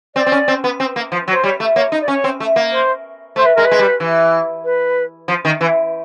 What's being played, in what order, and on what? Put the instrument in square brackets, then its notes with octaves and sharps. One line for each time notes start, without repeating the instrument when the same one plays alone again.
[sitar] C4 [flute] D5
[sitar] C4
C#4
C4
B3
C4
A#3
F3
F#3
[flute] C5
[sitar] G3 [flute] C#5
[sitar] A3
[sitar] A#3 [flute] C#5
[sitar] D#4
[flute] D5
[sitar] C#4 [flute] C#5
[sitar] C4
A3
A#3
[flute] C5
[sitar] A3 [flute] C5
[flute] B4
[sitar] G#3 [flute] A#4
[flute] B4
[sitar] G#3
G3
E3
[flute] B4
[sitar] F3
D#3
E3